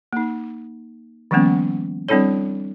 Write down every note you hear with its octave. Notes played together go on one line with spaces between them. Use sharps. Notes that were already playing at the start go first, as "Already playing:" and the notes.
A#3 D#4
D#3 F3 G3 A#3 B3 C#4
G3 C4 D4 E4 A4 C#5